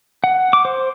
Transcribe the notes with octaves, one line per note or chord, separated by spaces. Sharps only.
F#5
D6
C5